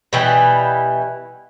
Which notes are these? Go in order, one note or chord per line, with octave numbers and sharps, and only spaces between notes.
B2 E3 G3